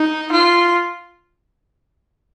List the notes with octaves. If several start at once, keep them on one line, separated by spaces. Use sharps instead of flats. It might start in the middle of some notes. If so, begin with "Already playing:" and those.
Already playing: D#4
F4